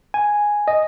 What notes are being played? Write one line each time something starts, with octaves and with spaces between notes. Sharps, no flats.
G#5
D#5